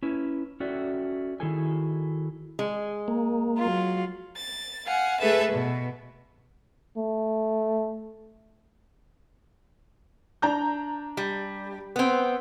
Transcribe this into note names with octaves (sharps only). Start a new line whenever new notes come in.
C#4 E4 B4
C#4 F#4 A4 D5 E5 G5
D#3 E4 F#4 G#4 A4 G#5
G#3
A#3
F#3 F4
A6
F5 F#5 G#5
A3 G#4 A4 B4 E5 A5
B2
A3
D4 A#5 G6
G3
B3 C4